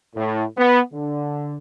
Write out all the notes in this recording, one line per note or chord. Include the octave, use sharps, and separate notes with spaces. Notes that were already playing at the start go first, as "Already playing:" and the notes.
A2
B3
D3